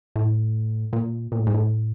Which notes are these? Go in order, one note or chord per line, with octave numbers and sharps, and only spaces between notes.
A2
A#2
A#2
A2
G#2
A2